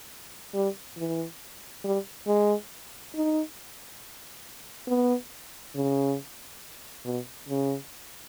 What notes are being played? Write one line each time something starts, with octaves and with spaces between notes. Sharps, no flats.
G3
E3
G3
G#3
D#4
B3
C#3
B2
C#3